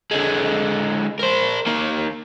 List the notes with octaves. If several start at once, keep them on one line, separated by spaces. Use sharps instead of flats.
D3 G#3
A#4 C5
D#3 A#3